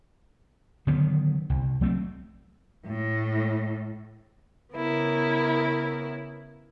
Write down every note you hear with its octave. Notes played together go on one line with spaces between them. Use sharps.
D3 D#3 F#3 B3
C2
F#3 A3 B3 C4
A2
C#3 B3 E4 A#4